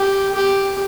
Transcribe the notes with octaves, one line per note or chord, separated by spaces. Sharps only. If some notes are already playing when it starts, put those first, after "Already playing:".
Already playing: G4
G4